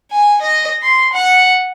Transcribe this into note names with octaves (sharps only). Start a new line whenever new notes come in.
G#5
D#5
C6
F#5